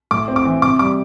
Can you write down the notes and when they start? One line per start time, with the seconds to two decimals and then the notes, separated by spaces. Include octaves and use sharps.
0.11 A2 D6
0.28 C4
0.36 D6
0.45 E3
0.62 C3 D6
0.79 G3 D6